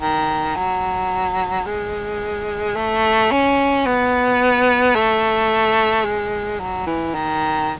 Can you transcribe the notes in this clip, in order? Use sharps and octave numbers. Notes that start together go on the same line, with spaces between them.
D#3
F#3
G#3
A3
C#4
B3
A3
G#3
F#3
E3
D#3